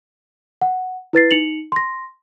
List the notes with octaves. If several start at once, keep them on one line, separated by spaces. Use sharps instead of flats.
F#5
E4 B4 A6 C7
D#4 C#7 F7 F#7
C6 A#6